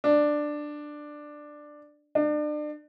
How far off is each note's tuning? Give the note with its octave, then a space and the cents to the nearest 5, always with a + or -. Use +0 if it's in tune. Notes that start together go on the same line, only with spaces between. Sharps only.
D4 +10
D4 +35